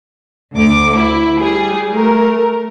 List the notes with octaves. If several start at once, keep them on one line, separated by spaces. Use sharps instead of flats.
D2 D6
E4
G3 G#4
A3 A#4